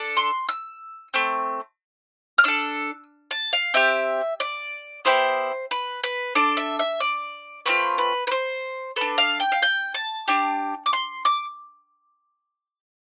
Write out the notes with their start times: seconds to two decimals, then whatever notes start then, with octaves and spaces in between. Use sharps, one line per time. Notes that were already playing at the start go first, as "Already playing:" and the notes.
Already playing: D4 A4
0.17 C6
0.49 E6
1.14 A3 C4
2.38 F6
2.44 D4 A4 E6
3.31 A5
3.53 F5
3.74 C4 G4 E5
4.40 D5
5.05 B3 E4 G4 C5
5.71 B4
6.03 B4
6.35 D4 A4 D5
6.57 E5
6.79 E5
7.00 D5
7.66 A3 C4 F4 B4
7.98 B4
8.27 B4
8.31 C5
8.96 D4 A4 B4
9.18 F5
9.40 G5
9.52 F5
9.62 G5
9.94 A5
10.28 D4 G4
10.86 D6
10.93 C6
11.25 D6